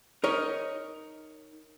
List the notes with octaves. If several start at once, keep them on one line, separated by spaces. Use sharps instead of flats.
D#4 A#4 C#5 D#5